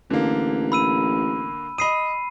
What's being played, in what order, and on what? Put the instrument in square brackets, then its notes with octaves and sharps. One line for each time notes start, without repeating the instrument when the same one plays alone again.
[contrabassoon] A1 [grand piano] D3 A#3
[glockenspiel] B5 E6 D#7
[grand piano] D#5 D#6 [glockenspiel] B5 C7 D#7